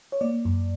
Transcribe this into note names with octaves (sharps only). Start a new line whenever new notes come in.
C#5
A#3 D5
F#2